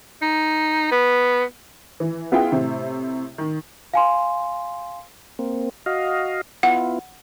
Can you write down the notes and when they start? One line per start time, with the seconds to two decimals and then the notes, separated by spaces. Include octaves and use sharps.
0.22 D#4
0.91 B3
2.00 E3
2.32 B3 E4 F4 G#4 G5
2.52 A2 C3
3.38 D#3
3.94 F5 G#5 C6
5.39 A#3 C4
5.86 F#4 D#5 F5
6.63 B3 E4 F4 F#5